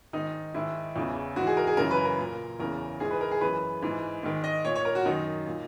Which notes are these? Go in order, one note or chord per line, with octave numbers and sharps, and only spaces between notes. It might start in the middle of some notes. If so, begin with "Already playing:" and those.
G#2 D#3 D#4
G#2 D#3 E4
E2 C#3 E3
G#2 E3 F#4
G#4
A#4
G#4
F#2 C#3 E3 A#4
B4
A#4
A#2
E2 C#3 E3 A#4
G#2 E3 G#4
B4
A#4
G#4
F#2 E3 B4
G#2 E3
G#2 D#3
D#5
A#2 C#5
C#5
A#4
F#4
F#2 D#3 D#4
A#2